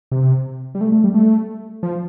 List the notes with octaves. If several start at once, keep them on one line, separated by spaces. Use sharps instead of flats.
C3
G3
A3
A3
G3
A3
F3